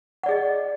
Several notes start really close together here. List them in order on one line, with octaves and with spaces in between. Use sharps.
F#5 D5 G#4 D#5